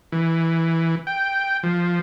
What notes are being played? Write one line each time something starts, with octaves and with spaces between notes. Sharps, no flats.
E3
G5
F3